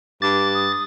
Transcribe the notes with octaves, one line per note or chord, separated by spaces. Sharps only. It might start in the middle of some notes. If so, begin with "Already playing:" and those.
G2 D6 A6
D#6